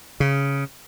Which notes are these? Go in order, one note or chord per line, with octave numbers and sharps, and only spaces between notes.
C#3